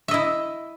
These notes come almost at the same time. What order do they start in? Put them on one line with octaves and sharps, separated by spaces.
E5 D#5 E4